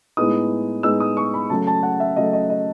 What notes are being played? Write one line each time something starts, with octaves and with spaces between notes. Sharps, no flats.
A2 G#3 B3 D#4 D#6
A2 G#3 B3 D#4 E6
D#6
C#6
B5
C#3 F#3 A3 A5
A5
F#5
E5
C#3 F#3 A3 D#5
D#5
D#5